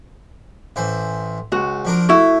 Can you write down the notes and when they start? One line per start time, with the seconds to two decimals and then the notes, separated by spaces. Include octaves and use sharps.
0.76 A1 E3 C5
1.52 C#2 F#4
1.85 F3 D4 A#4
2.09 A3 E4 F#4